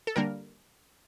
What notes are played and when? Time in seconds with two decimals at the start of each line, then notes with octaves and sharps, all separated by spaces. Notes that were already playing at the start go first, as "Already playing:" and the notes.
0.07 A4
0.16 D3 G3 A#3 D4 A#4